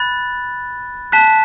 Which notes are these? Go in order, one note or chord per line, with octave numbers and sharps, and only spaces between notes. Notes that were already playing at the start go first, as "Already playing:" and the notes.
Already playing: B5 F#6 A6
A5 F#6 B6